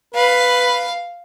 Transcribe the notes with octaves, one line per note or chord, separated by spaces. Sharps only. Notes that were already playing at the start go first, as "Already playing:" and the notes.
B4 F5